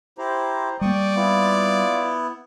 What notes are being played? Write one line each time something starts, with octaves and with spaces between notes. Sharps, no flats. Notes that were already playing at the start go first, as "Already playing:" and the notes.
E4 G4 C5 A#5
G3 G#3 A#3 D5 G5 C#6 D#6
B3 E4 F4